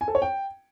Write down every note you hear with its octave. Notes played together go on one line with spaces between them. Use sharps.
G#5
A4
C#5
G5